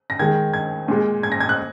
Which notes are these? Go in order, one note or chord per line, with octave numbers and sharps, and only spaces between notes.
A#6
D#3 G#3 G#6
G#6
A#2 G#3
G#6
A#6
G#6
F#6